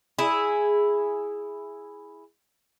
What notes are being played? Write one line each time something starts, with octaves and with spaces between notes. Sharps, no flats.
E4 G#4